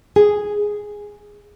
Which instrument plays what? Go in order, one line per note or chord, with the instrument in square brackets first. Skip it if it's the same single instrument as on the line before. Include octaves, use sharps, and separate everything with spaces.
[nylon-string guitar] G#4